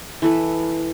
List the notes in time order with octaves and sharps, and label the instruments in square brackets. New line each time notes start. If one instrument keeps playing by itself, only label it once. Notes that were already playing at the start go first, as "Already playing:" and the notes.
[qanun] E3 A4 B4